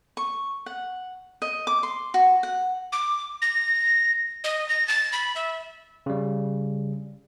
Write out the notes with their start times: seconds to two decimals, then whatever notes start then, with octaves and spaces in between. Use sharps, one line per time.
0.17 C#6
0.66 F#5
1.42 D#5
1.67 D6
1.83 C6
2.14 F#4
2.43 F#5
2.92 D6
3.42 A#6
4.44 D#5
4.69 A#6
4.88 A6
5.13 B5
5.36 E5
6.06 C#3 G3